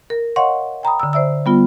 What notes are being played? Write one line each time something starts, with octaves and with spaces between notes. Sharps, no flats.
A#4
C#5 D#5 F5 F#5 C6 C#6
G5 A#5 B5 D#6
D3 E6
C5 D5 E5 E6
G3 B3 F4